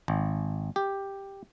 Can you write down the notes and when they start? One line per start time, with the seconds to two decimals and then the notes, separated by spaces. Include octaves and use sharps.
0.08 G#1
0.76 G4